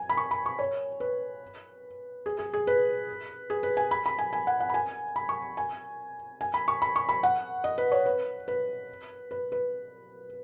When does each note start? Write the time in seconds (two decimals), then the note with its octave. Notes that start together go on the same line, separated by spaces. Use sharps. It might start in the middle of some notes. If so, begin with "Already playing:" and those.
Already playing: G#5
0.09 B5
0.17 C#6
0.31 B5
0.46 C#6
0.59 C#5
1.00 B4
2.26 G#4
2.39 G#4
2.53 G#4
2.67 B4
3.50 G#4
3.63 B4
3.77 G#5
3.91 B5
4.06 B5
4.19 G#5
4.33 G#5
4.47 F#5
4.60 F#5
4.70 B5
4.74 G#5
5.16 B5
5.29 C#6
5.57 G#5
6.41 G#5
6.54 B5
6.68 C#6
6.82 B5
6.96 C#6
7.09 B5
7.23 F#5
7.64 D#5
7.78 B4
7.92 C#5
8.06 B4
8.48 B4
9.31 B4
9.52 B4